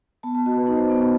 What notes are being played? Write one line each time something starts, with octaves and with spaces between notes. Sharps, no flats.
B3 A5
A5
F#4 D#5
B4
D#4 D#5
C5
B3 D#5